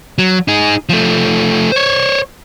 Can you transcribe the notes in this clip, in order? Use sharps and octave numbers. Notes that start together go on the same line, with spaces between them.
F#3
D#4 G#4
F3 A3
C5 C#5